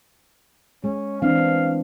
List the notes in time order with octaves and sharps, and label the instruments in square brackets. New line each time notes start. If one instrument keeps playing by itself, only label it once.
[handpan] G#3 [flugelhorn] C#4
[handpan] E3 C4 D4 [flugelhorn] F5